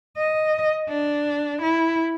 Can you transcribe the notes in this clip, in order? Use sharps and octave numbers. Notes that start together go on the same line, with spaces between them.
D#5
D4
E4